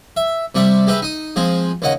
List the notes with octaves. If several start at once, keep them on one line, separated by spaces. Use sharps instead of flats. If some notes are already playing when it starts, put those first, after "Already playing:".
E5
C3 G3 D4 E5
G#3 G4 B4 E5
D#4 D#6
F3 G#3 C4 G#4
D#2 C#3 D#5 F#5